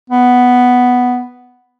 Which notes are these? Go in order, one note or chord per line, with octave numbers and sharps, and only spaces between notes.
B3